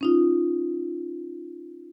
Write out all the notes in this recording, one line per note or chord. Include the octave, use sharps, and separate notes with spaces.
C#4 D#4 F4